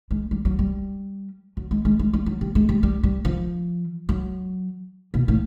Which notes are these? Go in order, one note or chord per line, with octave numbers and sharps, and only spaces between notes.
G#3
G3
F#3
G3
F#3
G#3
G#3
G#3
G3
F#3
G3
G#3
G3
G3
G3
F3
F#3
B2
A2